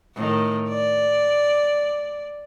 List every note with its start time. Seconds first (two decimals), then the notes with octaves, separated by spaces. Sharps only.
0.16 A2 D#3
0.70 D5